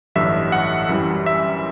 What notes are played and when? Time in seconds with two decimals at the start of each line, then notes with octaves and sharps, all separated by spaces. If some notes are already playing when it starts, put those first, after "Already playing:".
0.15 A1 G2 D3 F#3 E5
0.52 F#5
0.89 F#2 E3 G3
1.26 E5